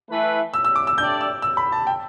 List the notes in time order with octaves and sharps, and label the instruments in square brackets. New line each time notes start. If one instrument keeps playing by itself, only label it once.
[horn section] E3 A3 E4 B4
[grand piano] E6
E6
D6
E6
[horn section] A3 D4 G4 D5 [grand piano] G6
[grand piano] E6
E6
B5
A5
G5